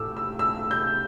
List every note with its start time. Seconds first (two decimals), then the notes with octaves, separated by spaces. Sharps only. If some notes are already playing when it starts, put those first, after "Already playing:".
Already playing: A2 A3 D6 E6
0.17 E6
0.39 E6
0.71 G6